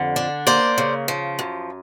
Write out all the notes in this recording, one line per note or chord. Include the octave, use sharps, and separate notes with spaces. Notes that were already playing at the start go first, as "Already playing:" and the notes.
Already playing: F2 D3
D4
A#3 C5 D5
C#3
F3
F#2